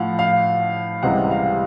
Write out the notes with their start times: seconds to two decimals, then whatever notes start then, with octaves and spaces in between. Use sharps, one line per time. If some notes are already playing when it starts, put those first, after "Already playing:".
Already playing: A2 F3 F5 F#5
0.19 F5
1.03 C#2 C3 E3 G3 F#5
1.31 F5